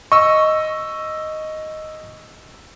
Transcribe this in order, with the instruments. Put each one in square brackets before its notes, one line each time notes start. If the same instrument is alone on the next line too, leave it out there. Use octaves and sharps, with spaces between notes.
[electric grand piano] D#5 E6 [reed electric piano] C#6